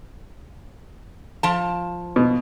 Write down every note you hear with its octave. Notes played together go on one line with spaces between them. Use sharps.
F3 A5
B2